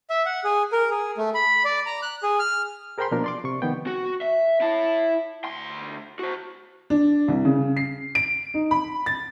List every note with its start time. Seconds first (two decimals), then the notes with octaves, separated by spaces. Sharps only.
0.10 E5
0.26 F#5
0.44 G#4
0.72 A#4
0.91 G#4
1.17 A3
1.34 B5
1.65 D5
1.86 A#5
2.02 F#6
2.23 G#4
2.39 F6
2.98 G#4 A#4 C5 G5 B5 C6
3.11 B2 F3 A#3 D4 F4 A#4
3.24 D5 C6 D6
3.44 C3 C#6
3.62 D#3 F3 B3 G5
3.87 F#4
4.21 E5
4.61 E4 A5
5.45 D2 C6
6.19 F#4 C5
6.90 D4
7.28 C2
7.45 C#3
7.77 C7
8.15 D7
8.54 D#4
8.71 B5
9.06 A6